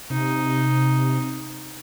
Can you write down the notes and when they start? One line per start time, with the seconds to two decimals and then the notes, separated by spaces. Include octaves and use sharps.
0.10 C3 D#4